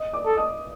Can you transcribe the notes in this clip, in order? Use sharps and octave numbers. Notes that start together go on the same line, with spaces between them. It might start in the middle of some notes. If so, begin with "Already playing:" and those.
Already playing: D#5 D#6
D5 D6
A4
D#5 D#6